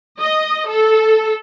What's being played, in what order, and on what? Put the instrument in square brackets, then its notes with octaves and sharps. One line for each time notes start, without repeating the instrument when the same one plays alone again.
[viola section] D#5
A4